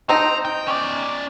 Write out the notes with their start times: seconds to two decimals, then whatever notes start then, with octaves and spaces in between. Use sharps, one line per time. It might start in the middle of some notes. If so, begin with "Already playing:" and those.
0.09 C4 D#4 A#5
0.45 G5
0.67 C#4 D5